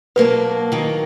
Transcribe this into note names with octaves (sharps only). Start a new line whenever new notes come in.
B2 F#3 A#3 D4 B4
D#3 F#3 A#3